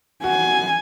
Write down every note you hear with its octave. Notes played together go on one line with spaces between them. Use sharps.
F#4 G#5